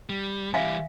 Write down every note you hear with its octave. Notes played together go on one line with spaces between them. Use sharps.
G3
E3 G3 E5 F5 G#5